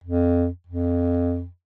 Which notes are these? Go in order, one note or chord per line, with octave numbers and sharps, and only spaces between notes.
F2
F2